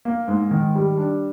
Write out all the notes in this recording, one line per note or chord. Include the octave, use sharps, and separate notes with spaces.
A#3
G#2
D#3
G3
D4